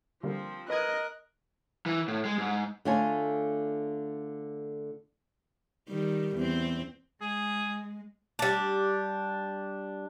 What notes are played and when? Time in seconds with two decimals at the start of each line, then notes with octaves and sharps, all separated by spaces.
0.23 D3 F3 G3 A#3 C4
0.70 A#4 B4 D#5 D#6 F#6 G#6
1.86 E3
2.08 A2
2.25 G#3
2.38 G#2
2.85 D3 A3 F4 C#5 G#5
5.89 D#3 G3
6.36 E2 C4
7.21 G#3 G#4
8.39 G3 D4